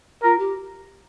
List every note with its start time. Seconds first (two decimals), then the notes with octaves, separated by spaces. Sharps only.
0.23 F4 A#4
0.39 G4